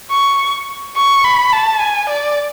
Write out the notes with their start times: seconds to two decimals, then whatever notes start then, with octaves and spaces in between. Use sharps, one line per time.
0.11 C#6
0.96 C#6
1.24 B5
1.53 A5
1.81 G#5
2.09 D5